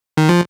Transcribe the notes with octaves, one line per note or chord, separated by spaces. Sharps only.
D#3
F3